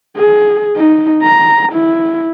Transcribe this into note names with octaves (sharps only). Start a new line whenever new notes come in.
G#4
D#4
A#5
E4